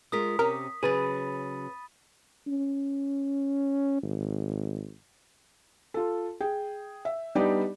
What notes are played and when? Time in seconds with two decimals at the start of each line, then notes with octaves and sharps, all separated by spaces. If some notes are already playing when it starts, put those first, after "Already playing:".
0.12 G#3 F4 A#4 D#6 B6
0.39 C3 C#4 G4 A#4
0.83 C#3 F#3 G#4 B4 B5 A6 D#7
2.47 C#4
4.03 G#1
5.94 F4 A4
6.40 G#4 G5
7.05 E5
7.35 G3 B3 D4 D#4 G4 D5